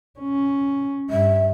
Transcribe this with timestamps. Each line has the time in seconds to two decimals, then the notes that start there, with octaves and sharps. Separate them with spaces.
0.19 C#4
1.10 G2 E5